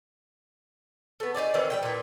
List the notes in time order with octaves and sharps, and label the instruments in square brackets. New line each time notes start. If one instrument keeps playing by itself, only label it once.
[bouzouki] A3 B3
D#4 E4 G#4 D5
D#3 E3 G3 C4
G3 G4 G5
A#2 E3